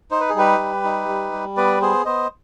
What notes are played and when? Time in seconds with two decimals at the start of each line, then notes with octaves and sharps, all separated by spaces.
0.11 D#4 C5
0.20 B4
0.29 G#4
0.34 G3 G4 B4
0.59 G3
0.84 D#4
1.09 G3
1.33 G3
1.57 B3 B4 D5
1.81 B3 G#4 C5
2.05 B3 C5 D#5